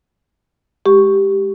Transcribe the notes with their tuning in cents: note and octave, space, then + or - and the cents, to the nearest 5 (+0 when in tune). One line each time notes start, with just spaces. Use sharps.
G#3 -5 G4 +0 C#6 +0